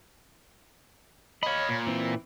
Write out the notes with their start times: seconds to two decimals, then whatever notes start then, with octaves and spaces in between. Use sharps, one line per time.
1.43 C#5 D#5 F5 B5
1.69 A#2
1.87 E3 C4